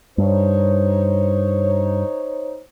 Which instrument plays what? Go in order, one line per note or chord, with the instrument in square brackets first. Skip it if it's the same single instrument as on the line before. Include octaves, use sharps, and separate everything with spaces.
[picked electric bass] G2 [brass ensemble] D#4 C5 C#5